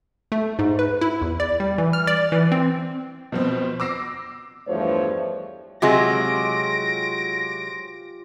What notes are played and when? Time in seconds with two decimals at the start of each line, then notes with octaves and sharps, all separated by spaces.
0.32 A3
0.59 G#2
0.79 B4
1.01 E4
1.22 E2
1.40 D5
1.60 G3
1.78 E3
1.93 F6
2.07 D5
2.32 E3
2.52 C4
3.32 B2 F3 C4
3.80 D6 E6 A#6 C7
4.67 E2 G2 F3 A3 C5 C#5
5.82 C3 F#3 G#3 F4 G4 G#5 A#6 D7